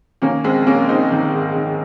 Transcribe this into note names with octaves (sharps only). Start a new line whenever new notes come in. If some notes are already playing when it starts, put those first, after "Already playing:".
D#3 A#3 C#4
A#1 G#3 C4
A#1 A#3 C#4
A#1 C4 D#4
D#3
G#2
D#3